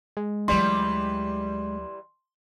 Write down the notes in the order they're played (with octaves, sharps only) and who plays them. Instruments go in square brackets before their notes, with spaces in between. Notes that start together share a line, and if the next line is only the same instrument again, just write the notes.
[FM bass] G#3
[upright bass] D2 F#3 [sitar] E3 G3 [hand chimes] C6